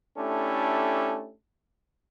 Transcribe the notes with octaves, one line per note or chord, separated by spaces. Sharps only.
A3 C#4 D4 E4 G4 A4